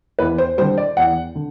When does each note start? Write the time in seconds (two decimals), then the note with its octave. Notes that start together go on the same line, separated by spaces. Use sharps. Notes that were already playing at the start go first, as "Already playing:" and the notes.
0.19 E2 B4
0.38 C5
0.58 G3 C5
0.61 D3
0.78 D5
0.97 E2 F#5
1.35 D3